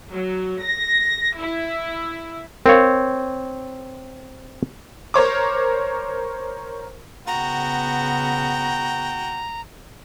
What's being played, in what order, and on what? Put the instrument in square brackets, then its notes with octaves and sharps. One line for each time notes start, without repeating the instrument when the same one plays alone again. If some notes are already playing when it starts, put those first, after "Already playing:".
[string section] F#3
A#6
E4
[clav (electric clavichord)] C4 C#5 [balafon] A#4 F5
[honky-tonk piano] A#4 C5 C#5 D6
[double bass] C#3 B3 [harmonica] F#4 G5 [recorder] A#5